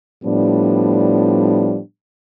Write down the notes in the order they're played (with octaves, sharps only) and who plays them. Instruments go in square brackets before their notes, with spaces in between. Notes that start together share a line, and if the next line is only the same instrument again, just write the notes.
[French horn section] A2 F3 G3 B3 D4